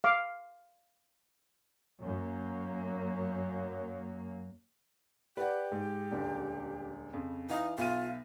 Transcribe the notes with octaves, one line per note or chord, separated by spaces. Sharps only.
F5 D6
F#2 A#3
G4 B4 D5 F#5
G#2
D#1 C#2 D3
F2 C#3
E3 D#4 F5
B1 F4 E5 D#7